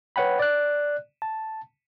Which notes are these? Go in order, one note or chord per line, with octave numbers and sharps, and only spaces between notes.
B4 C#5 F#5 G5 B5
D5 F#6
A5